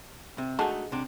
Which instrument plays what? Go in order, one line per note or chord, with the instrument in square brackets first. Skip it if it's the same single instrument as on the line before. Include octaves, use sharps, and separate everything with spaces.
[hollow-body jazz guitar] C3
[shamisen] D3 G#3 A5 [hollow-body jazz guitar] A3 D#4 F#4
[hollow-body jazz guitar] C3 D4